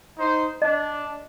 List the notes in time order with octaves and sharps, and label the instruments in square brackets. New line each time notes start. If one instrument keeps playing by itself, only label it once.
[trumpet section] D#4 C5
[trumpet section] D4 [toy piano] D#5